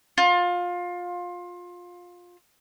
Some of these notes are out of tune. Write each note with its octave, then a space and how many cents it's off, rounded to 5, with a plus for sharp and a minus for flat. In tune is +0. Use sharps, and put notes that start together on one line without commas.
F4 +20